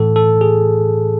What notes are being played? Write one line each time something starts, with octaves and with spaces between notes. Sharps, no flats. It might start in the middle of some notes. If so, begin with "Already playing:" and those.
Already playing: A2 E3 A4
A4
G#4